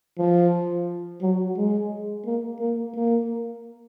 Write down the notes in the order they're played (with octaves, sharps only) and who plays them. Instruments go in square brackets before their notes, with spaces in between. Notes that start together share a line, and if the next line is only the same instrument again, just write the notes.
[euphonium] F3
F#3
G#3
A#3
A#3
A#3